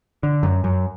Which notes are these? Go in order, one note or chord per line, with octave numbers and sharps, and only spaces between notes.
D3
F#2
F#2